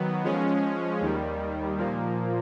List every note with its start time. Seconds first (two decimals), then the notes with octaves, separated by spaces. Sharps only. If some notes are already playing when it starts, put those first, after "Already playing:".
Already playing: D#3 F#3 B3
0.24 F3 G#3 C#4
1.01 D#2 D#3 G3
1.78 A#2 F3 A#3